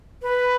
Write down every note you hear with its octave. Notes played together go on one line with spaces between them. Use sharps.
B4